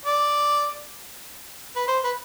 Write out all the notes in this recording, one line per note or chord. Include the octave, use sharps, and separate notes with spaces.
D5
B4
C5
B4